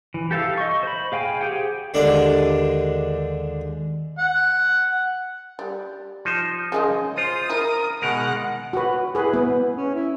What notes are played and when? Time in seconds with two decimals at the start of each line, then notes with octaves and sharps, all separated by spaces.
0.14 E3
0.31 G4 A4 E5 F5 E6
0.58 D#5 C#6
0.83 C5 B5
1.12 G#4 F5 G5 G#5
1.41 G4 G#4 C5 F#5 G5
1.94 D#2 D3 G#3 D4 D5
4.19 F#5
5.59 G3
6.25 F3 D#4 C5
6.72 C#3 G#3 D#5
7.17 F4 C5 D#6
7.50 E4 A#4
8.02 B2 D#3 G#3 A#4 F#5
8.73 F#4 B4
9.15 E4 G#4 B4
9.34 B3
9.77 C#4
9.95 E4